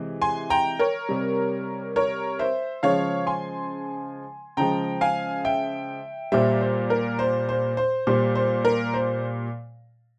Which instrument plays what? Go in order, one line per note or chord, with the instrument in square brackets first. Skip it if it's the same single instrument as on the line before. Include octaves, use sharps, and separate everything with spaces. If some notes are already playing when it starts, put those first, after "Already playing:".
Already playing: [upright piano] C3 E3 G#3
G#5 C6
G5 A#5
A#4 C#5
C3 G3
A#4 C#5
C5 E5
C#3 F3 G#3 C#5 F5
G#5 C6
C#3 F3 G#3 G5 A#5
F5 G#5
E5 G5
A#2 G3 C5 E5
C5
A#4
C5
C5
C5
A#2 G3 C5
C5
A#4
C5